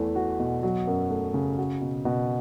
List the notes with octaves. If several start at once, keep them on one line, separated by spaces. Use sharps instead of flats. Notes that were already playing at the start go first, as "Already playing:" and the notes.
Already playing: E2 E3 A3
F#4
B2
F#3
F#2
A3
C#3
F#4
B2
B2